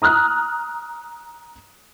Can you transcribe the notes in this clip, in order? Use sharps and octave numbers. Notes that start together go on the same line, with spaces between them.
A#5 D#6 F6 F#6